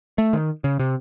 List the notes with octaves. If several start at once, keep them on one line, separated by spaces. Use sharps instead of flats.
A3
D#3
C#3
C3